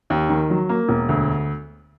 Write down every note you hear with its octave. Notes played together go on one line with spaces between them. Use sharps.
D#2
D#3
F#3
A#3
E1
D2